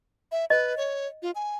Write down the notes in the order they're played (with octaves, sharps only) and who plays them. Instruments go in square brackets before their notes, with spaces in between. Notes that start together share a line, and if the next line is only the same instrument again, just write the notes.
[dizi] E5
[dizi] B4 [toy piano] D#5
[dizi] C#5
F4
G#5